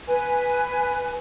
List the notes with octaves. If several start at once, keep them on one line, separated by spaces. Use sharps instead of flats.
B4 G#5